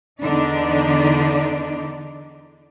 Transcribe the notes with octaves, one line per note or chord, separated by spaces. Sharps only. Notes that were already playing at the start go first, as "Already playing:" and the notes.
E2 D3 D4 D#4 D5